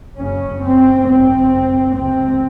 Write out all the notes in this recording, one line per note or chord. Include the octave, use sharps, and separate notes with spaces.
F#1 F#2 C#3 C#4
C4
G#1 F#2 C#3 C4
C#2 C3 C4